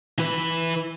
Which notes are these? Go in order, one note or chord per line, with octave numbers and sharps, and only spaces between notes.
E3 B4